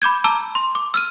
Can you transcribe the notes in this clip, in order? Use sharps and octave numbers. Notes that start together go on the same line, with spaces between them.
B5 D6 G6 G#6
A5 A#5 D6 E6
C6
D6
E6 F6 D#7